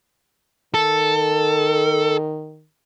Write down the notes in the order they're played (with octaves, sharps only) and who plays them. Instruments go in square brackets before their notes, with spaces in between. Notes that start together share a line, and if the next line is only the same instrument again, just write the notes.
[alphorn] D#3 [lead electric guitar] A4